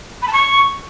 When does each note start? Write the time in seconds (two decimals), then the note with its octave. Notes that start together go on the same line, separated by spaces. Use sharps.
0.22 B5
0.28 A5
0.33 C#6